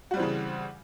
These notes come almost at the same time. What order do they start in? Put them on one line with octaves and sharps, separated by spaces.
F#4 G3 C4 E3 C#3